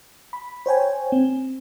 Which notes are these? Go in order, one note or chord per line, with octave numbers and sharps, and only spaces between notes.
B5
C5 C#5 G5 G#5
C4